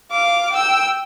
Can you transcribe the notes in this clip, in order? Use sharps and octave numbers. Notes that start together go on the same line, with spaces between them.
F5 D6
G5 E6